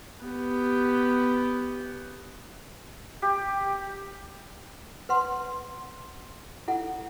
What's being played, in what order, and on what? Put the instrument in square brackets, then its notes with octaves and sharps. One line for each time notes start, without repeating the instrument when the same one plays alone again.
[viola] B3 G4
[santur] G4
[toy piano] B4 F#5 C6
E4 A4 F#5